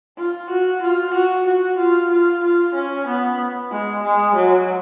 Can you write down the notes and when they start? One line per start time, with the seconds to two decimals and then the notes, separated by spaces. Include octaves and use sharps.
0.18 F4
0.50 F#4
0.82 F4
1.14 F#4
1.46 F#4
1.78 F4
2.11 F4
2.43 F4
2.75 C#4
3.07 B3
3.71 G#3
4.04 G#3
4.35 F#3